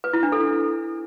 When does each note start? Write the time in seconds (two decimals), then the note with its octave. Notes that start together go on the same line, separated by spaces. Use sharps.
0.04 B4
0.13 E4
0.23 D4
0.32 A4